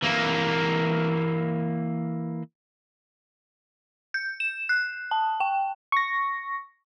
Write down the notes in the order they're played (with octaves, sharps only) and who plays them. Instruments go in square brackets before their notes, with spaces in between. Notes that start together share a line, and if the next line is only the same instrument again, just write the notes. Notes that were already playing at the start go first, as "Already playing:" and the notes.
[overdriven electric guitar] E3 A#3
[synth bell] G6
E7
F#6
A5
G5
[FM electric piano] C#6 A#6